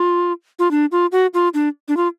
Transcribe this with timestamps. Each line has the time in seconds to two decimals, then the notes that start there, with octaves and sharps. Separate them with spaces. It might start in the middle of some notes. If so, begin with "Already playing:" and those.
Already playing: F4
0.59 F4
0.71 D4
0.92 F4
1.12 F#4
1.34 F4
1.54 D4
1.88 D4
1.97 F4